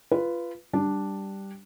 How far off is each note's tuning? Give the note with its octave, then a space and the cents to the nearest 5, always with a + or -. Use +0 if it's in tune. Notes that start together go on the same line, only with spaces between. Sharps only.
F4 -20 B4 +0
G3 +0 D4 +0